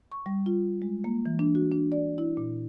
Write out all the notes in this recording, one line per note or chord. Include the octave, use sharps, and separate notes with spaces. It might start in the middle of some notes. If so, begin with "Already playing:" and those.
C#6
G3
F4
G#3
A#3
E3
D4
F#4
D4
D5
E4
A#2